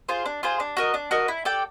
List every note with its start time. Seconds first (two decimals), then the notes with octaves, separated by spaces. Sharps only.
0.09 F4 G#4 C5
0.26 D4
0.43 F4 G#4 C5
0.60 D4
0.77 F#4 A#4 D#5
0.94 D4
1.11 F#4 A#4 D#5
1.28 E4
1.45 A4 D5 G5